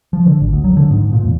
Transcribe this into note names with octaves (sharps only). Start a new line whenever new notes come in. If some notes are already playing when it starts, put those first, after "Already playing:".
F3
D3
G#1
D2
F#3
D3
G#2
A#2
E2